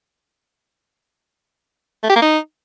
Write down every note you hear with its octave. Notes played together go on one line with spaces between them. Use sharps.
A3
G4
A#3
D#4